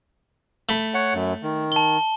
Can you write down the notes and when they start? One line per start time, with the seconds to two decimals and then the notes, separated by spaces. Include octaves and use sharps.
0.69 A3 B5
0.94 C#5 F#5
1.14 F#2
1.43 D#3
1.72 A5 G7